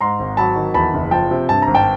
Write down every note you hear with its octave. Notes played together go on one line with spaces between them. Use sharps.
G#2 A#5 C6
G#1
F#3 A5 B5
D#3
E2 A5 B5
F#1
F3 G5 A5
C3
G2 A5
G#1 A#5
G5 A5